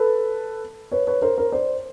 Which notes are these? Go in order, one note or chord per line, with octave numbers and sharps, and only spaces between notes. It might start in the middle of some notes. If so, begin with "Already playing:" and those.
Already playing: A4 B4
B4 C#5
B4 C#5
A#4 C5
A#4 C5
C5 D5